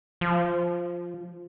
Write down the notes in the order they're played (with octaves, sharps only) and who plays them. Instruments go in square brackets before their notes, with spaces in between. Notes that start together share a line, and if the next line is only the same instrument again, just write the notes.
[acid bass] F3